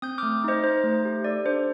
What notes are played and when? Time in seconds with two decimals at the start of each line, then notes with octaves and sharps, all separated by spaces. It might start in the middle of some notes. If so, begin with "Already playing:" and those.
0.02 C4 D#6 G6
0.18 A3 D6 F6
0.44 D#4 C5 D#5
0.64 D#4 C5
0.84 A3
1.05 G4
1.24 A4 D5
1.45 D4 C5